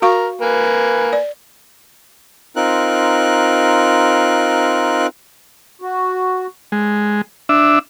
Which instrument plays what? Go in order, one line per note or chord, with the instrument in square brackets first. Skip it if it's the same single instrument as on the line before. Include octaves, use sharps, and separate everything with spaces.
[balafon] F#4 F5 C#6 [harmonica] A#4
[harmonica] A#3 B4 G#5
[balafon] D5
[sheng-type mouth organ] C4 D#4 F4 A#4 F#6
[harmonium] F#4
[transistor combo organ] G#3
D4 E5